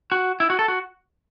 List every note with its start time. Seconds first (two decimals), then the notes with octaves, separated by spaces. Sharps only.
0.12 F#4
0.40 E4
0.50 F#4
0.59 A4
0.68 F#4